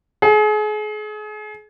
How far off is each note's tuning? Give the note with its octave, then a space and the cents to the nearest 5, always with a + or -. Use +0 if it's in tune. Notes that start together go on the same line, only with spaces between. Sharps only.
G#4 +35